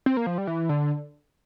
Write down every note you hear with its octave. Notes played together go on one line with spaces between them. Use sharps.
C4
A#3
F3
G3
E3
D3